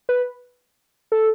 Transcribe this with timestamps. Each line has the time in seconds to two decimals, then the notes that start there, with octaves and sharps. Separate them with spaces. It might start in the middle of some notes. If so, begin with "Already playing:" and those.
0.09 B4
1.12 A4